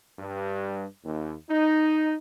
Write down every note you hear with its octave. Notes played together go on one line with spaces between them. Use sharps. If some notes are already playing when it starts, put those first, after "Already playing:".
G2
D#2
D#4